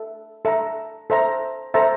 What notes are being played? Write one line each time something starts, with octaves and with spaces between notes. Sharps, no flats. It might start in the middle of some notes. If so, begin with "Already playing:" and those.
Already playing: A4 E5
A4 E5 A#5
A4 C5 E5 A#5
A4 C5 E5 A#5